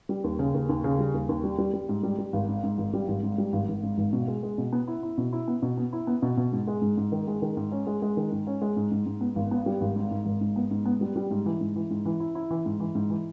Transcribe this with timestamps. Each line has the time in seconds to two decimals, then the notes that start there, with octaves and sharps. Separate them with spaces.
0.09 G3
0.24 D#2
0.39 C#3
0.54 D#2
0.69 D#2
0.84 C#3
0.99 G3
1.14 D#2
1.29 D#2
1.44 G3
1.58 G3
1.74 G3
1.89 G#2
2.03 G3
2.18 G3
2.33 G#1
2.48 G#2
2.63 G#2
2.78 G#1
2.93 G3
3.08 G#1
3.23 G#2
3.38 G3
3.53 G#1
3.68 G#1
3.83 G#2
3.98 G#1
4.13 B2
4.28 G#3
4.43 G#3
4.58 B2
4.73 B3
4.88 E4
5.03 E4
5.18 B2
5.33 E4
5.48 B3
5.62 B2
5.77 B3
5.93 E4
6.07 B3
6.22 B2
6.37 B2
6.52 G#2
6.67 G#3
6.82 G#2
6.97 G#2
7.12 D#3
7.27 G#3
7.42 D#3
7.57 G#2
7.72 C#4
7.87 G#3
8.02 G#3
8.17 D#3
8.32 G#2
8.47 C#4
8.62 G#3
8.77 G#2
8.92 G#2
9.06 G#2
9.21 B3
9.36 G#1
9.51 B3
9.66 G3
9.81 G#1
9.96 G#2
10.11 G#2
10.26 G#1
10.41 G#2
10.56 B3
10.71 G#2
10.85 B3
11.01 G3
11.16 G3
11.31 G#2
11.46 E3
11.61 G#2
11.76 E3
11.91 G#2
12.05 E3
12.20 E4
12.35 E4
12.50 E3
12.66 G#2
12.80 E3
12.95 G#2
13.10 E3